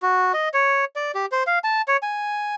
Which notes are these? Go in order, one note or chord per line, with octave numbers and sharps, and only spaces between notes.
F#4
D#5
C#5
D5
G4
C5
F5
A5
C#5
G#5